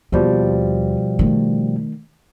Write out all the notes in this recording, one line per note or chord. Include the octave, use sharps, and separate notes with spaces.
D#2 B2 F3 G3 B3
D#3 A3